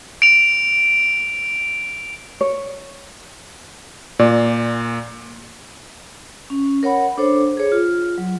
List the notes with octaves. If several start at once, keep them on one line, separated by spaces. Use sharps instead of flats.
D7 F7
C#5
A#2 D5
C#4
A#4 C#5 F#5 B5
D4 A4 C5 C#5
G#4 C#5
F4
F#3